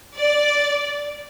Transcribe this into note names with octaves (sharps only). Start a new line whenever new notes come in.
D5